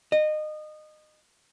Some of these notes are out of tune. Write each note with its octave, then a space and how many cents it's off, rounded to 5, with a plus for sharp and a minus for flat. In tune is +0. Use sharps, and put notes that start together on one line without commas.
D#5 -25